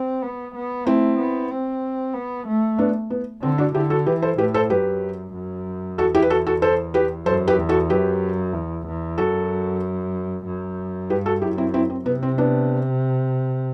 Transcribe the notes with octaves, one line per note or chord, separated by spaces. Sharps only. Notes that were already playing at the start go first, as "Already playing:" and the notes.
Already playing: C4
B3
B3
A3 C4 E4
B3
C4
B3
A3
B3 D4
B3
D3 C4
D4 F#4
D3 E4 G4
F#4 A4
E3 G4 B4
A4 C5
A2 G4 B4
A4 C5
F#2 G4 B4
F#2
E2 F#4 A4
E4 G4
B4
F#4 A4
F#4 A4
A4 C5
G4 B4
F#2 A4 C5
G4 B4
E2
F#4 A4
F#2 G4 B4
E2
E2
F#2 F#4 A4
F#2
G2 G4 B4
F#4 A4
F#2 E4 G4
C4 E4
C4 E4
C4
C3 B3
C4
B3 D4